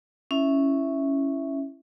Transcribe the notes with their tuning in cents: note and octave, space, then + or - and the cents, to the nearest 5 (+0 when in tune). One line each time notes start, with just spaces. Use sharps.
C#4 -5 E4 +0 E5 +0